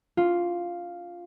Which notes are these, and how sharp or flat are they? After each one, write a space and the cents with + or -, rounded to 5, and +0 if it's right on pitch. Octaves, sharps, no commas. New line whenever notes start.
C#4 +45 F4 +0